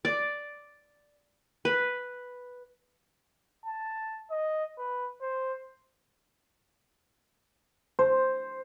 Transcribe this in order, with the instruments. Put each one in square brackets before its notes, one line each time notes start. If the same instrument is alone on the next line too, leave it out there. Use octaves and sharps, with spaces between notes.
[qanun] D5
B4
[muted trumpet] A5
D#5
B4
C5
[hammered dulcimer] C5